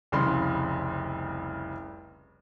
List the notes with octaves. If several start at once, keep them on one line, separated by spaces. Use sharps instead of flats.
F1 C2 C#3 B5 C6